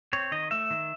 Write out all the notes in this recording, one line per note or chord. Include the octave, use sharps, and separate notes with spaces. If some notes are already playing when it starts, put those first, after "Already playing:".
C4 C#5
D#3 D#5
A3 E5
D#3